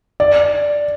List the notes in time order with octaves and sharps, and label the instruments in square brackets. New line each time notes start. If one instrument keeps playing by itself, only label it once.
[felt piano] D5